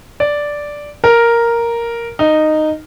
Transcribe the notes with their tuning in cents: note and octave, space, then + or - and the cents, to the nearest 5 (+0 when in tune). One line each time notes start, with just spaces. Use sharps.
D5 -5
A#4 +0
D#4 -10